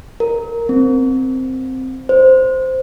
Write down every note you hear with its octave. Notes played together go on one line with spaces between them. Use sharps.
A#4
C4
C5